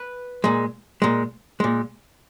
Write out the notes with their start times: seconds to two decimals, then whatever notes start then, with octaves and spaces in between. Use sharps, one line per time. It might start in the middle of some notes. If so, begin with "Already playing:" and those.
Already playing: B4
0.44 A#2 G#3
1.02 A#2 G#3
1.60 A#2 G#3